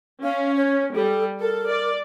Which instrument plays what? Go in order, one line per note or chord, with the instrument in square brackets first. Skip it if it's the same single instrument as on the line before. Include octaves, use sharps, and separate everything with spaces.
[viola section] C#4 [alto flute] F5
[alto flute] C#5
[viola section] G3 [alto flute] A4
[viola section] A4 [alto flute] A#4
[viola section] D5